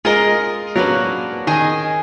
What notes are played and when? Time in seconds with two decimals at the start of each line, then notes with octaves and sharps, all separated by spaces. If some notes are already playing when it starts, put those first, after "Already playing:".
0.05 G#3 F4 A#4 D#5
0.76 F#3 A#3 D4 F#4 B4
1.47 D#3 G#4 D#5 G#5